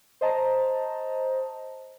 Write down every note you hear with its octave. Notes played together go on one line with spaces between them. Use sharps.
C5 D#5 A5 A#5